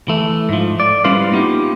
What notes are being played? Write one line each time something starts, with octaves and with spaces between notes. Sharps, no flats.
E3 A3
G#2 F3
D5
G3 C#4 E4 B4 C5 F5
A#3 B3 D#4 F4 G4